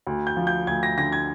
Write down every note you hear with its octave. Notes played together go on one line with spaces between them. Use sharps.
D2
G6
F3
G6
D2 G#6
A#6
D3 A#6
G#6